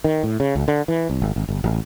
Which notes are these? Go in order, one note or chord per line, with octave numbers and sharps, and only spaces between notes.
D#3
A2
C#3
C#2
D3
E3
C2
G#1
G#1
G1
A1